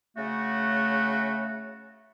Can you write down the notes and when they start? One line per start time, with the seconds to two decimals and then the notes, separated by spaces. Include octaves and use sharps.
0.16 C#3 A3 F#4